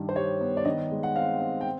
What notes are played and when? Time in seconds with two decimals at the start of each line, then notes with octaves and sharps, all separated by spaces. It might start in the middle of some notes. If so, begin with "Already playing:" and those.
Already playing: G2 D#3 G3
0.09 C5
0.16 G3 C#5
0.41 B3
0.57 D5
0.65 D#3 D#5
0.91 G#3
1.03 F#5
1.16 C4 F5
1.40 C4
1.61 G5